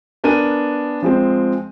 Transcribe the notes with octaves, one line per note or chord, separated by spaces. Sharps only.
B3 D4 A#4 G#5 D#7
F3 G#3 C4